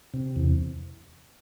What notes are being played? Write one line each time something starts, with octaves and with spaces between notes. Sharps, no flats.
C3
E2